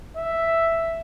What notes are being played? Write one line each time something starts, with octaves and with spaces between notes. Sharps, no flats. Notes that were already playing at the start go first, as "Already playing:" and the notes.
E5